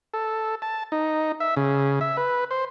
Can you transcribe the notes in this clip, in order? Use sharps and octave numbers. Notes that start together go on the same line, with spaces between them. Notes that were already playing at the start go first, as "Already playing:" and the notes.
A4
A5
D#4
E5
C#3
E5
B4
C5